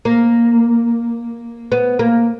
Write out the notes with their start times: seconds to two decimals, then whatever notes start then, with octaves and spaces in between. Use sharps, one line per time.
0.05 A#3
1.72 B3
1.99 A#3